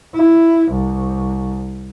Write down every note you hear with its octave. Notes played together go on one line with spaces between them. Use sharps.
E4
C2